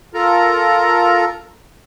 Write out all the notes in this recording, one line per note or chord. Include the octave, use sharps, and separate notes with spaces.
F4 A4 A#4 A#5